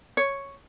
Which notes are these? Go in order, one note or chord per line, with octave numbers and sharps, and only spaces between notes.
C#5